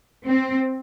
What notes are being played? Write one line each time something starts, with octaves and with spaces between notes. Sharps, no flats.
C4